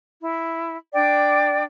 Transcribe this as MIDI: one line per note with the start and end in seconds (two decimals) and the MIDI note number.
0.22 0.75 64
0.93 1.63 62
0.93 1.63 74
0.93 1.63 79